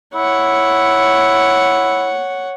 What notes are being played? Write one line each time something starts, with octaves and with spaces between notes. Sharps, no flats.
E4 C#5 F#5